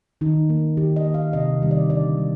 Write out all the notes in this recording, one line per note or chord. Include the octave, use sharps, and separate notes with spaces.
D#3 D#4
A#3
D#3 G4
D#5
A#3
F5
C3 D#5
D#3 G3 C4
D5
D3 D5
G3